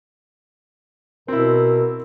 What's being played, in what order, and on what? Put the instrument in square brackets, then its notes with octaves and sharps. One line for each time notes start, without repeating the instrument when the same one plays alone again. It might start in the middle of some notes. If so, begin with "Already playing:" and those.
[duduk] B2 [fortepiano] C4 E4 [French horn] A#4